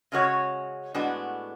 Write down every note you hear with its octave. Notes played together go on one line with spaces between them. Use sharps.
C#3 G#3 C#4 F#4 C#5
A2 G#3 B3 D4 F#4